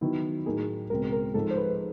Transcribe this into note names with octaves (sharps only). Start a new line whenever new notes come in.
D#3 F#3 B3 E4
A2 F#3 A#3 D#4 G#4
C#2 B2 G#3 C4 A#4
A#4
G#2 F3 G#3 A4
C5
B4